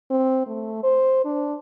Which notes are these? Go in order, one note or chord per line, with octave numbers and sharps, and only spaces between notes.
C4
A3
C5
D4